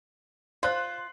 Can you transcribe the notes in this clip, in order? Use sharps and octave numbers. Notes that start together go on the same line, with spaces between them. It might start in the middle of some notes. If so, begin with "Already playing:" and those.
F4 C5 F#6